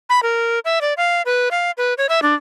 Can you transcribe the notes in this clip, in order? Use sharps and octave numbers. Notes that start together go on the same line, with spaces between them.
B5
A#4
E5
D5
F5
B4
F5
B4
C#5
E5
D4